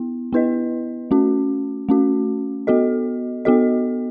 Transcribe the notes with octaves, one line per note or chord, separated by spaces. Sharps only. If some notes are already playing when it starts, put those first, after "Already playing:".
Already playing: B3 E4
B3 E4 B4 D#5
A3 C#4 F#4
A3 C#4 F#4
B3 F#4 A4 D#5
B3 F#4 A4 D#5